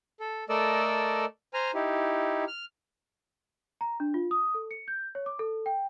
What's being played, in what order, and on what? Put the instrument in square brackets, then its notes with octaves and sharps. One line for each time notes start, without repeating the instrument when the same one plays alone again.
[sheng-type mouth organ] A4
A3 A4 A#4 D5 D#5 E6
C5 G#5 A#5 F6
D#4 E4 G4
F6
[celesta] A#5
D4
F4
D#6
A4
C#7
G6
C#5
D6
A4
G5